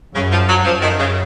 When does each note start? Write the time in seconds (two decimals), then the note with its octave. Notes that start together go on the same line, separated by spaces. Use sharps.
0.14 F#2 C#3
0.31 F3
0.48 F#3
0.64 F#2 F3
0.81 D#3
0.99 C#3